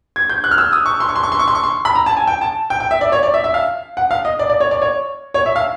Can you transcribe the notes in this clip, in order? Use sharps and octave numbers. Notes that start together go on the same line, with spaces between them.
G#6
G6
F#6
F6
E6
D#6
C#6
C6
C#6
C6
C#6
C6
C#6
C6
C#6
C6
B5
A#5
A5
G#5
G5
A5
G5
G5
E5
D5
C#5
D5
E5
E5
F5
F#5
F5
D#5
D5
D5
C#5
D5
C#5
C#5
E5
F5